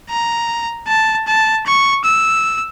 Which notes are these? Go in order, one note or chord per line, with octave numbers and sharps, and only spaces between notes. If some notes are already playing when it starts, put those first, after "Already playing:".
A#5
A5
A5
C#6
E6